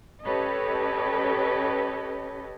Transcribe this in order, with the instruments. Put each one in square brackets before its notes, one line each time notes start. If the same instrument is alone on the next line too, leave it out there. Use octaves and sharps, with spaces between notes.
[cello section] C#4 G4 A4 B4 C#5 D#5